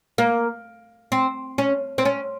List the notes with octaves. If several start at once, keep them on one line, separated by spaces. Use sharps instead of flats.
A#3
C4
C#4
C4
C#4